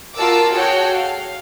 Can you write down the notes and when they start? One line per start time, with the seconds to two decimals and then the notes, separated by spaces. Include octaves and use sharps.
0.16 F4 F#4 A#4 A5 D6 E6
0.53 F#4 G#4 A4 C#5 F#5 G5
0.93 F5